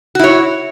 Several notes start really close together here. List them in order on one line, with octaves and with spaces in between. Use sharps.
F#4 E4 C#5